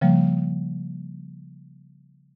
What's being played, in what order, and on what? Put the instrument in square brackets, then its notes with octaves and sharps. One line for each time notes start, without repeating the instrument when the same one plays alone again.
[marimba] C#3 F3 G3 A#3